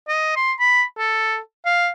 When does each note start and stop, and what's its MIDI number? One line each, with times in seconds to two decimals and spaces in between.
0.08 0.32 75
0.36 0.53 84
0.59 0.83 83
0.97 1.38 69
1.65 1.89 77